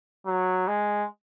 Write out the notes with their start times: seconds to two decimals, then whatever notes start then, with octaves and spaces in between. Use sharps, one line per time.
0.27 F#3
0.68 G#3